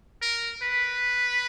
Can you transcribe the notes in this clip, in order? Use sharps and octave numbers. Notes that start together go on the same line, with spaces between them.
A#4
B4